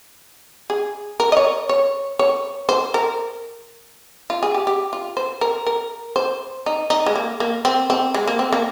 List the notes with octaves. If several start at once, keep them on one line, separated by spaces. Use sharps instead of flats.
G#4
A#4
D#5
C#5
C#5
C#5
C5
A#4
F4
G#4
G4
G4
F4
C5
A#4
A#4
C5
D#4
D#4
G#3
A#3
A#3
C4
C4
G#3
A#3
C4
A#3